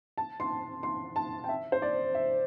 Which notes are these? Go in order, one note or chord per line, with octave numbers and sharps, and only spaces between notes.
A5
C6
C6
A5
G5
E5
C5
D5
E5